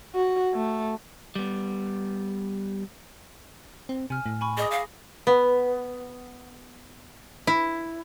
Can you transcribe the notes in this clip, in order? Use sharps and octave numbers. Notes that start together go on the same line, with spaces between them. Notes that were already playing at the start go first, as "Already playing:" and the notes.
F#4
A3
G3 B3
C4
C3 G#5 F6
A2
G#5 B5 C#6
G#4 D#5 D6 D#6
F5 A#6
B3
E4